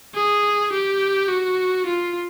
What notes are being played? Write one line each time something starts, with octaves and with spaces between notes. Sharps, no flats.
G#4
G4
F#4
F4